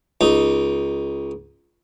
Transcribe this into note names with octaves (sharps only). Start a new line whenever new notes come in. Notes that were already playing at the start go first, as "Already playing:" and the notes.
C#2 D#4